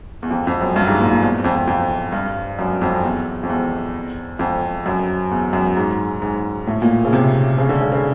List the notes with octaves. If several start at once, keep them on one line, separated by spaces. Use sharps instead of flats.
E2
F2
F2
F#2
G2
G#2
A#2
A#2
E2
E2
F2
F2
F2
G2
F#2
F2
E2
F2
E2
F2
F#2
E2
F#2
G#2
G#2
A2
A#2
C#3
C3
C#3
D3
C#3
C#3